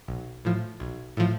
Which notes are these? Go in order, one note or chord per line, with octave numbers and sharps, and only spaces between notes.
B1
A2 F3
B1
A2 F3